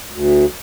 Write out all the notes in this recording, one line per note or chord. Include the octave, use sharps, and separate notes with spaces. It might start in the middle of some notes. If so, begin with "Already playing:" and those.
D2